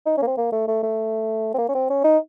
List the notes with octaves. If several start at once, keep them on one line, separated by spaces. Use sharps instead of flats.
D#4
C#4
A#3
C4
A#3
A3
A3
A3
C4
A#3
C#4
C4
C#4
D#4